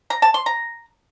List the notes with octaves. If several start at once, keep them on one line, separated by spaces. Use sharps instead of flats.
A#5
A5
C6
A#5